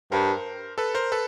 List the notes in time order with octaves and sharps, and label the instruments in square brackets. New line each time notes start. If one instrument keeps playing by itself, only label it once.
[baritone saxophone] G2 [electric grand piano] A#4 C5
[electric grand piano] A4 B4
A#4 C5
A4 B4